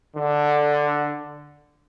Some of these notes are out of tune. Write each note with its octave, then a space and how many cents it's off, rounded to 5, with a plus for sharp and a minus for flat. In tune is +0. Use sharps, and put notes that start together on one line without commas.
D3 +5